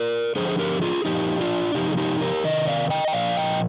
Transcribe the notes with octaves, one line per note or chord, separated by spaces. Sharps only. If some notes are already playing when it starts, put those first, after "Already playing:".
Already playing: A#4 D5
D3 F3 G#4 C5
G#4
G4 A#4
F4 G#4
A#2 F3 D#4 G4
D4 F4
C3 F3 D#4 G4
G#4
D#4 G4
G4 A#4
C3 D#3 D#5
D5 F5
D#5 G5
G5
A#2 F3 D5 F5
D#5 G5